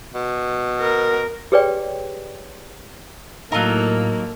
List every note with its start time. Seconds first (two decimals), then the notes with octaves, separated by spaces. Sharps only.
0.14 B2
0.81 A#4
1.52 G4 G#4 B4 C#5 D5 G5
3.52 A2 F#3 A#3 D#4 F4 A4 A#4